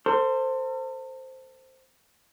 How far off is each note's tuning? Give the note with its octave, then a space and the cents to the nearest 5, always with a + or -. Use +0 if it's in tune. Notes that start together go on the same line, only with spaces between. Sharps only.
A4 +40 C5 +0